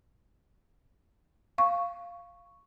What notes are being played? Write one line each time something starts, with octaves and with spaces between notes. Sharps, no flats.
F5 C#6